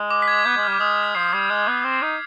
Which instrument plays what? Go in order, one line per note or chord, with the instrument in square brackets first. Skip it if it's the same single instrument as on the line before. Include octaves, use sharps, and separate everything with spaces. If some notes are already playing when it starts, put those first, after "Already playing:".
Already playing: [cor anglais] G#3
[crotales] D6
B6
G#6
[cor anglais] B3 [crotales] G6
[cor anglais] G#3
[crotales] F6
[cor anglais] G3 [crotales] D6
[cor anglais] G#3 [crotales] D#6
[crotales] B6
[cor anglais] F3 [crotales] C7
[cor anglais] G3 [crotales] G#6
[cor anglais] G#3 [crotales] G6
[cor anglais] B3 [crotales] D#6
[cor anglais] C4
D#4